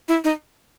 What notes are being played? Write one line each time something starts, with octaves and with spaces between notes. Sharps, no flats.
E4
D#4